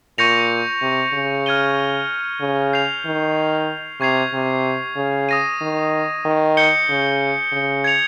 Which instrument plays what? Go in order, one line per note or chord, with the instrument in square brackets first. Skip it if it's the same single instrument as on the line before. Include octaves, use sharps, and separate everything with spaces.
[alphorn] A#2 [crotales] C#6 G6 A#6 C#7 F7
[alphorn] C3
C#3
[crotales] F6 G#6 D#7 G7
[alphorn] C#3
[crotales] G6 C7 F7
[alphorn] D#3
[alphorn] C3 [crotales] C#6 G#6 C7 F7
[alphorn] C3
C#3
[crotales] D#6 A#6 D#7
[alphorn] D#3
D#3
[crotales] G6 C#7 G7
[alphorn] C#3
C#3
[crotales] G#6 C#7 F7